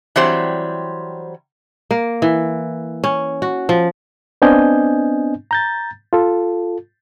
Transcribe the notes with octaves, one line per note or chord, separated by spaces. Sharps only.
E3 F#3 G3 C4 C5
A#3
E3
C#4
F#4
F3
B3 C4 D4 D#5 G#5 G6
A#5 G6 A6
F4 A4